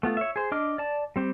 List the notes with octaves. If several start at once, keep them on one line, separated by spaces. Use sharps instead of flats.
A3 B3 F4
C#5 E5
G#4 C5
D4 D#5 D6 F6
D5 A5
G3 C4 G4